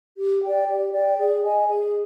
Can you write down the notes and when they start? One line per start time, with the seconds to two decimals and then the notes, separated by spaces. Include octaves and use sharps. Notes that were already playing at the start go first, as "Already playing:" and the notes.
0.17 G4
0.41 D5 G5
0.67 G4
0.92 D5 G5
1.17 G#4
1.42 D#5 G#5
1.68 G#4